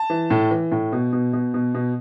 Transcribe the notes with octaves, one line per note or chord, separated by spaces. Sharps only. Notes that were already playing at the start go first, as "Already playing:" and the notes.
Already playing: A5
E3
A2
E3
A2
B2
B2
B2
B2
B2